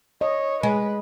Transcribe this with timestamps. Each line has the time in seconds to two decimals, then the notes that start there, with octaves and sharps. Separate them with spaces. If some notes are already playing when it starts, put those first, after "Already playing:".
0.21 C#5 D#5
0.63 G#3 B4